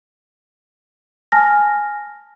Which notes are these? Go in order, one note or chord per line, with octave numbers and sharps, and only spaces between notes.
G#5 A5 F6 A#6